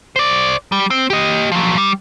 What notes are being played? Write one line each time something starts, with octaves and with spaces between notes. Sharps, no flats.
C5 D5
G3
C4
G4 D#5
F3 F#3
G3